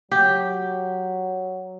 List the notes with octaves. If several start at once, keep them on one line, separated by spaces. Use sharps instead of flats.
F#3 G4